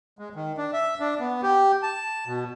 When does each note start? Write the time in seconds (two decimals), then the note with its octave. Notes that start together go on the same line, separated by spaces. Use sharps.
0.19 G#3
0.36 D#3
0.58 D4
0.73 E5
1.00 D4
1.20 B3
1.43 G4
1.83 A5
2.27 B2